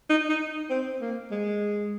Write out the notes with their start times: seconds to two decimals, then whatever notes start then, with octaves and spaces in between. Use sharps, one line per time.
0.10 D#4
0.29 D#4
0.70 C4
1.01 A#3
1.31 G#3